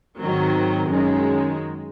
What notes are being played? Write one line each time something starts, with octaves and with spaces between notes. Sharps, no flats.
G#2 D#3 F#3 C4
F#2 D#3 G#3 C#4